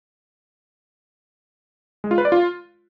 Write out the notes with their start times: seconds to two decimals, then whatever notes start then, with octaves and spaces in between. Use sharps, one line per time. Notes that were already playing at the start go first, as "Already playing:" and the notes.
2.04 G#3
2.11 F4
2.18 B4
2.25 D5
2.32 F4